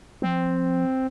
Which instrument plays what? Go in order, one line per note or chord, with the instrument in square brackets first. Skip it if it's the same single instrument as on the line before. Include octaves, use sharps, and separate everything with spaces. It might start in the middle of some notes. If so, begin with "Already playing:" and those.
[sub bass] F3 [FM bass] C4